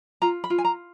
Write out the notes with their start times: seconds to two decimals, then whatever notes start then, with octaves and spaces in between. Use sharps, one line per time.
0.22 F4 A#5
0.44 B5
0.50 F4
0.58 G#5
0.65 A#5